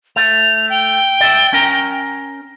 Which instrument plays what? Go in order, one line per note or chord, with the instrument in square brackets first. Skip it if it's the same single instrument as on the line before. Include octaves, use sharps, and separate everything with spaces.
[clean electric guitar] A3 [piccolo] F7
[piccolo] G5
[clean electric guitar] D5 E5
C#4 A#4 A#5